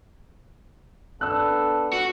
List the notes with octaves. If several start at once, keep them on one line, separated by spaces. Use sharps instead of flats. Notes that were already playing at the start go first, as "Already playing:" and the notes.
B3 D4 A4 B4 E6 F#6
F#4